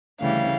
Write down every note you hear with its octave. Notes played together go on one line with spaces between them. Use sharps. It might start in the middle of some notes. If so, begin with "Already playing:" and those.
D2 C#3 E3 G3 F5